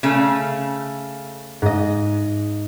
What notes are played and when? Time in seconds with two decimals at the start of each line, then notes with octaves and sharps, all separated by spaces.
0.03 C#3 A3
1.62 G#2 D#5